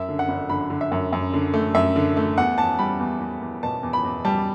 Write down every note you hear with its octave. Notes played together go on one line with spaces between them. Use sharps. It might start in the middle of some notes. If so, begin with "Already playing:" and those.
Already playing: F#2 E5
D3
F#5
G1
D3 B5
D3
E5
F#2
F#2
D3
A3
F#2 E5
D3
A3
E2 F#5
E2 A5
G3 B5
E2
E2
E2
B2 A5
E2
B5
E2
G3 A5